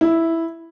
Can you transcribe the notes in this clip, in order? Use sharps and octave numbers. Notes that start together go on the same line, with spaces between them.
E4